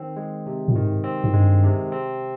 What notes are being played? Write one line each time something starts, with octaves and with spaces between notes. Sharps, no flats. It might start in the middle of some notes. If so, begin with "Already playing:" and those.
Already playing: D#3 C4
G#3
C3
A#2
G#2 D#3
C4
G#2
G2 G#3
C3
C4